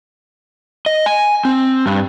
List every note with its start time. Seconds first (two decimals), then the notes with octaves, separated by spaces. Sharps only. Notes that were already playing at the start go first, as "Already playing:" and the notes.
0.86 D#5
1.06 G#5
1.45 C4
1.86 G2